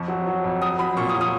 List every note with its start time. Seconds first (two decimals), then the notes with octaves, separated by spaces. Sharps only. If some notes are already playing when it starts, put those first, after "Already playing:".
Already playing: F2 F3 C#6
0.08 F#3
0.27 F#3
0.44 F2
0.62 F#3 D#6
0.79 F#3 B5
0.97 A#2 C#6
1.09 D#6
1.15 F#3
1.21 D#6